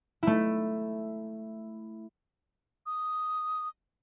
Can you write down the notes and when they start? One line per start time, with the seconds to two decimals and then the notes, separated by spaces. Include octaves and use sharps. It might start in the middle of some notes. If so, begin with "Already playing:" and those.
0.23 A3 E4
2.86 D#6